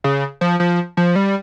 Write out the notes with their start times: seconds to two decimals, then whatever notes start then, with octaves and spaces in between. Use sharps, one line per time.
0.04 C#3
0.41 F3
0.60 F3
0.97 F3
1.16 G3